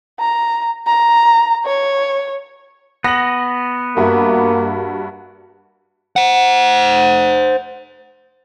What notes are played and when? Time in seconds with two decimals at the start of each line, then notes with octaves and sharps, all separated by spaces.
0.20 A#5
0.87 A#5
1.66 C#5
3.04 B3 A#6 F#7
3.97 G2 A#3 F#4 E5
6.16 C5 F#5